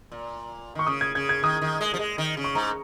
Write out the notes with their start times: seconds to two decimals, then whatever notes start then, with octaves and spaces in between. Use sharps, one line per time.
0.12 A#2
0.75 D#3 C#6
0.87 C#3 D#6
1.01 G#6
1.15 C#3 G#6
1.29 G#6
1.43 D#3 D#6
1.62 D#3
1.81 G#3
1.94 F3
1.99 G#3
2.18 D#3
2.37 C#3
2.44 C#6
2.55 G#2 A#5